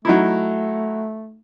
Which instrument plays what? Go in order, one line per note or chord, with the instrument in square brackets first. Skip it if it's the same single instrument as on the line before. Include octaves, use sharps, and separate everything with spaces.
[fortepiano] F#3 D#4 E4 [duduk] A3